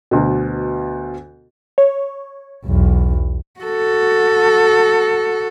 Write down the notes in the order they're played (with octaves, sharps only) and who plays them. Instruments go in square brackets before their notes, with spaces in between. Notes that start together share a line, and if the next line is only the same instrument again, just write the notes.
[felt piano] D2 B2
[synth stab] C#5
[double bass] B1 E2
[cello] F#4 A4